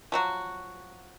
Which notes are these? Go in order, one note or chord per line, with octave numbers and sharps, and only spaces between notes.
F3 F#3 F#4